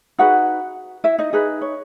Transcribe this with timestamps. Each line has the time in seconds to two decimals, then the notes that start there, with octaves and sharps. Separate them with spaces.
0.19 D#4 F#4 G#4 B4 F#5
1.04 E4 E5
1.19 D#4 D#5
1.33 D#4 G#4 B4
1.61 C#5